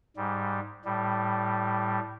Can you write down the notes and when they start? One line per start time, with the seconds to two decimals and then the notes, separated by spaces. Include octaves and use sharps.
0.17 G#2 G3
0.85 A2 G3